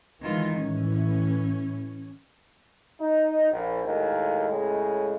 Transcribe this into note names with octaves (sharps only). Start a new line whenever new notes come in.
D#3 E3 G#3 F4
A2 E3 C#4
D#4
A#1
D#2 A2 G#3 A#3
A2 C#3 G#3